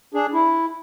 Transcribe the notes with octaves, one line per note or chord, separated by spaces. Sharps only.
D4 G#4
E4